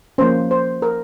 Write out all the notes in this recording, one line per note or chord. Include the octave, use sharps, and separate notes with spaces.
F3 A#3 C#4 C5
C5
A#4